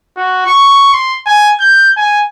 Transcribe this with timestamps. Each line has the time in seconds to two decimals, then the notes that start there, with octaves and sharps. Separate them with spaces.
0.17 F#4
0.47 C#6
0.93 C6
1.26 G#5
1.60 G6
1.97 G#5